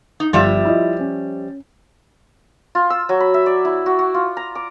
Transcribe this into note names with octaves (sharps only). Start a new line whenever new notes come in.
D#4
G1 F3 G3 E5
E4 F4 D#5
C#4
F4
E6
F#3
B5
E5
D5
E4
F#4
F#4
F4
A#5
D6